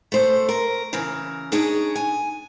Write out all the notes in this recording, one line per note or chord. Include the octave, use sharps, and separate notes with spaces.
A3 C5
A#4
C#3 E3 A#4
D4 D#4 G#4 C#5
G#5